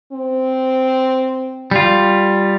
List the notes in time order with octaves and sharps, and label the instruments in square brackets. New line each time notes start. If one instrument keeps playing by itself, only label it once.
[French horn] C4
[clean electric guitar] G3 F4